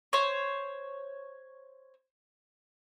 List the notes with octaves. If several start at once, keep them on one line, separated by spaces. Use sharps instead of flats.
C5 C#5